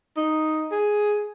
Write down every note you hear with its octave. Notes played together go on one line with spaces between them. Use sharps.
D#4
G#4